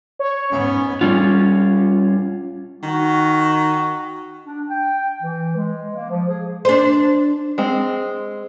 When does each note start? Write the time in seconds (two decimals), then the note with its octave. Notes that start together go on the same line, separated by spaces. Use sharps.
0.19 C#5
0.51 G#2 B3 C#4
1.01 G3 C#4 F4
2.83 D#3 F#4
4.46 D4
4.70 G5
5.22 E3
5.56 G#3
5.96 A#3
6.10 F3
6.29 G#4
6.65 D4 C5
7.58 G#3 C4